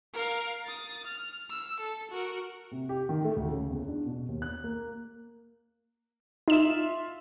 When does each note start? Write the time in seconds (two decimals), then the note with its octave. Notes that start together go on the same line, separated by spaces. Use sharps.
0.14 A#4 F5
0.65 D#6 A6
1.05 F6
1.50 E6
1.80 A4
2.11 F#4 A#4
2.71 C3
2.89 G4
3.09 D#3
3.24 A3
3.36 D2
3.50 C#3
3.70 E2
3.88 D4
4.06 B2
4.28 D#2
4.42 F#6
4.64 A#3
6.48 D#4 F4 E5 E7